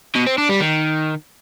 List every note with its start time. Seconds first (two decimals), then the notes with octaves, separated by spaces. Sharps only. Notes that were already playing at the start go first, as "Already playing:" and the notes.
0.15 B2
0.27 C4
0.38 D4
0.49 G3
0.60 D#3